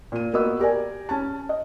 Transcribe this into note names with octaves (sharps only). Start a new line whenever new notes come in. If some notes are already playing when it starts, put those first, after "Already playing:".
A#2 D#7
A#3 B3 F#4 D#5 E6
G4 A#4 D5 G#5
C#4 A5
D#5